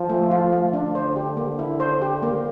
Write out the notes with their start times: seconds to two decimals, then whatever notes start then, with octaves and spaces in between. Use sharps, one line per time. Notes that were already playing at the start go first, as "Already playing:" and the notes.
Already playing: F3
0.09 A3
0.31 F4
0.53 A3
0.73 D4
0.95 D3 C5
1.16 G4
1.37 A#3
1.59 E4
1.80 C5
2.02 G4
2.23 A#3